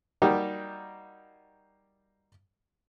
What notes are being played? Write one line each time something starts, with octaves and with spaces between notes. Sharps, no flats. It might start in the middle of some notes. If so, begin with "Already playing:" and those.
G3 A#3 D#4 F#4 G4